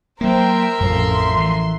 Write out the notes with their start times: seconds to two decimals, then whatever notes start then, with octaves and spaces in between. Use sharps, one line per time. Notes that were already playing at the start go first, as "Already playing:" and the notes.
0.21 F#3 A#3 A#4 C5 E5 G5
0.80 A1 F2 F3 C6
1.37 E3